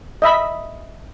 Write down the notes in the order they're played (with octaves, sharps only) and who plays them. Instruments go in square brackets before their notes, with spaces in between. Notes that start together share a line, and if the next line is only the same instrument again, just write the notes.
[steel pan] D#5 E5 B5